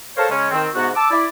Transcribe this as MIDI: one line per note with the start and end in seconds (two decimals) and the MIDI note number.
0.16 0.27 69
0.16 0.27 70
0.16 0.27 72
0.16 0.27 73
0.16 0.27 77
0.30 0.50 49
0.30 0.50 56
0.30 0.50 61
0.51 0.67 51
0.51 0.67 60
0.74 0.89 44
0.74 0.89 48
0.74 0.89 59
0.74 0.89 66
0.95 1.10 81
0.95 1.10 86
0.95 1.10 88
1.10 1.26 64
1.10 1.26 74